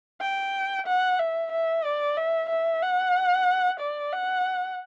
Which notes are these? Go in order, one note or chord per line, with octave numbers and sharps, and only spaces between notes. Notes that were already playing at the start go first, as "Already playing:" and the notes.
G5
F#5
E5
E5
D5
E5
E5
F#5
D5
F#5